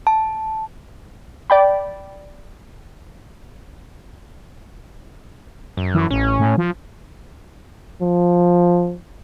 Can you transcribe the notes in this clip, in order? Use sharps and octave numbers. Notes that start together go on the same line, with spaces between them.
A5
D5 G5 B5
F#2
E3
A1 C#4
A2
F3
F3